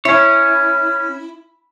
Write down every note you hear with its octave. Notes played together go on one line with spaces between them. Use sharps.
C#4 E4 C#5